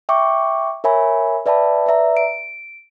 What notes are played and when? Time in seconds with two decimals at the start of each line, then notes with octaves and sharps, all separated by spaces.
0.09 E5 G5 C#6 D6
0.84 A#4 C#5 E5 G#5 B5
1.46 B4 D5 E5 G5 A5 B5
1.86 B4 D5 E5 A#5
2.17 D7